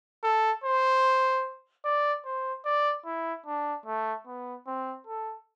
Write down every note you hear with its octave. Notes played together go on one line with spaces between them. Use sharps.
A4
C5
D5
C5
D5
E4
D4
A3
B3
C4
A4